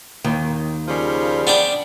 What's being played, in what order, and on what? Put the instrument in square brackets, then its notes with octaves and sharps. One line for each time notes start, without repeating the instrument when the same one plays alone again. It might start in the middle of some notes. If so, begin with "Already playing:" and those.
[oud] D#2 D#3
[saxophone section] C#3 F3 G3
[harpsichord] B3 D4 G5